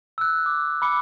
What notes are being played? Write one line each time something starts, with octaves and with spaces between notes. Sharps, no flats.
E6 F#6
D6
B5 D6 C#7